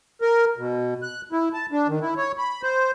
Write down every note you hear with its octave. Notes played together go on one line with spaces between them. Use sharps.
A#4
B2
F#6
E4
A5
D4
D#3
E4
C#5
B5
C5